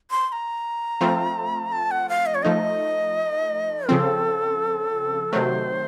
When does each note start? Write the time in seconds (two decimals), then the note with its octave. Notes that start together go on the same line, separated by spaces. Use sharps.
0.11 C6
0.29 C6
0.32 A#5
1.01 F3 A3 C4 F4
1.72 A5
1.91 F#5
2.09 F5
2.26 D#5
2.35 C#5
2.43 F3 A3 D#4 D#5
3.89 C#3 F3 C4 A4
5.33 C3 D#3 F#3 A3 C5